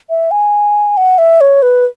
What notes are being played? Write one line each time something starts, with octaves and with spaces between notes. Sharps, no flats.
E5
G#5
F#5
E5
C#5
B4